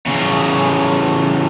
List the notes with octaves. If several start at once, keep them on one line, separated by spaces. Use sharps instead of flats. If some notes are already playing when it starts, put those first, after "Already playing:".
E2 C#3